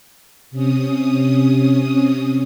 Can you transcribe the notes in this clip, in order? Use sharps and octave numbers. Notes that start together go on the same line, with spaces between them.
C3 C#4 D#6